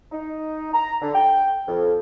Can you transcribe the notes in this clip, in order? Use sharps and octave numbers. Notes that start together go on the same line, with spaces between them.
D#4
A#5
D3
G5
F2